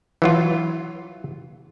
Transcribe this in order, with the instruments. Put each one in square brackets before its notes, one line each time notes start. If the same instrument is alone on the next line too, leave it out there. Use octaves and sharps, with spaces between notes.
[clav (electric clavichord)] E3 F#3 F4